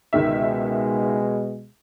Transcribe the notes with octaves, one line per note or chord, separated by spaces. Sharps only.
C#2 B2 D#3 G#3 E5